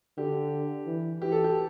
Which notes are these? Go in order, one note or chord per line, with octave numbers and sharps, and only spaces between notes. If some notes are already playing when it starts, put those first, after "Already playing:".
D3 G4
E3
E3 G4
A4
G4